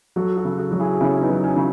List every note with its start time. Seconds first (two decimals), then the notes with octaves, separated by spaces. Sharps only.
0.16 F#3 F#4 A4
0.37 F#4 A4
0.45 C#3
0.58 F#4 A4
0.71 F#3 F#4
0.80 E4 G#4
1.00 C#3 C#4 E4
1.17 C#4
1.21 B3 D#4
1.29 F#3
1.44 C#4
1.57 C#3